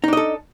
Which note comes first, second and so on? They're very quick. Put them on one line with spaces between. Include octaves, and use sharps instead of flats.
D#4 D4 D#5 A4